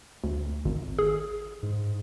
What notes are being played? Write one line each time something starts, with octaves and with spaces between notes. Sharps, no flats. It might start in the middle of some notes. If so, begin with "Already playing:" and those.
D2
G#1
G#4
G#2